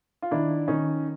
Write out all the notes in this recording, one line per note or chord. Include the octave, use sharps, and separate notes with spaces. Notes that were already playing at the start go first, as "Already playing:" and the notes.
F4
D#3 D4 E4
D#3 C#4 D#4